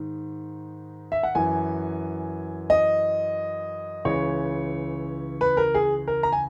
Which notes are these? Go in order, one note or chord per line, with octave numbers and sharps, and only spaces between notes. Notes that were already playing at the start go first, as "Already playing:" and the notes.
Already playing: G#2 D#3
E5
F#5
F#2 E3 G#5
D#5
C#2 C#3 E3 C#5
B4
A#4
G#4
A#4
A#5
G#5